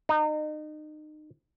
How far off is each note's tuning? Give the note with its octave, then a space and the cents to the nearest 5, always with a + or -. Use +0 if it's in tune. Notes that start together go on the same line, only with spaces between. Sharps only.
D#4 -30